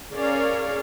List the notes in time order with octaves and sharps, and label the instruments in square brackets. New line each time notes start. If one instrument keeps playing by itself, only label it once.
[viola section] C#4 G#4 A#4 C#5 D5 F5